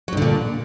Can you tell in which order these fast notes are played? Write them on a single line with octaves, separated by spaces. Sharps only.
F#3 G2 D3 A#2